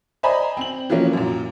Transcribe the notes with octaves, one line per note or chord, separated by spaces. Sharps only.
C5 D5 D#5 G#5 A#5 B5
C4 F#7
E3 F3 A#3 C#4
F#2 A#2